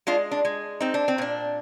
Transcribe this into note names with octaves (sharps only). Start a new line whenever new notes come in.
G#3 D4 F4
D4
G#3
C4 D#4
D4
C4
A#2 D4